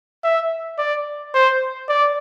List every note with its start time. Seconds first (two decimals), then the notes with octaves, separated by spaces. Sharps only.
0.24 E5
0.78 D5
1.34 C5
1.89 D5